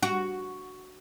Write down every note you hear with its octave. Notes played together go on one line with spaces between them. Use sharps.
F#4